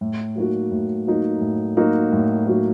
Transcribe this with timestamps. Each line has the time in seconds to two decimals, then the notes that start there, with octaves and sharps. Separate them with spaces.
0.01 A2
0.36 F#3 A#3 D#4 F#4
0.72 A2
1.07 F#3 A#3 D#4 F#4
1.41 A2
1.77 F#3 A#3 D#4 F#4
2.12 A2
2.46 F#3 A#3 D#4 F#4